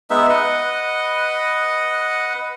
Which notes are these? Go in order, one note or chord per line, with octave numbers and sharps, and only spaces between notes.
G#3 B3 D#4 E5
B4 D#5 F#5